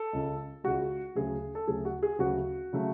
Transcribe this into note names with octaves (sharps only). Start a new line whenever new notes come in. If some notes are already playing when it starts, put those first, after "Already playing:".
Already playing: A4
C#2 C#3 G#3
C#2 C#3 G#3 F#4
D2 C#3 F#3 A3 G#4
A4
D2 C#3 F#3 A3 G#4
F#4
G#4
D2 C#3 F#3 A3 F#4
C#3 F#3 A3